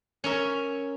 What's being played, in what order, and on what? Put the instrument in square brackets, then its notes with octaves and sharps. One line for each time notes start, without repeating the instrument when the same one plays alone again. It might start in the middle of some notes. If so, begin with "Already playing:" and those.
[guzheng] C#4 A#4 E5